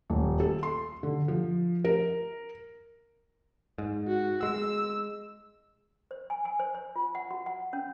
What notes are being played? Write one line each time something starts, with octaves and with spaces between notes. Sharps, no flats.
D#1
A4
C6
D3
F3
A#4
G#2
F#4
G#3 E6
C5
G#5
G#5
C5
C5
F4
F#5
F#4
F#5
C#4